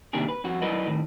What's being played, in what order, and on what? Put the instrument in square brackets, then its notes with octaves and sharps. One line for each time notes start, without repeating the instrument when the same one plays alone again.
[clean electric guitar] C3 D#3 A#3 D4 G4 G#4
B4
F2 F#4
F#3 E4 A#4 B4 D5 D#5
A2 D#3